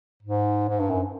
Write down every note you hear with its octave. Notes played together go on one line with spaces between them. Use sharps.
G#2
G#2
G2
F#2